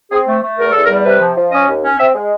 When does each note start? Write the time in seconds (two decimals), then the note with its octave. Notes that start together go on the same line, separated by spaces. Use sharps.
0.11 C4 G#4
0.28 A3
0.43 A3
0.58 E2 A#4
0.72 E2 A4
0.84 A#4
0.89 G3
1.05 C3 B4
1.22 F3
1.37 F3
1.52 C#4 D#5
1.68 D#2
1.83 C#4
1.99 C4 E5
2.15 G#3